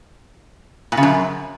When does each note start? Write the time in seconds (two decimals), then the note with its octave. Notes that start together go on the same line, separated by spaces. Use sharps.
0.92 A#2
0.97 C#3
1.03 F#2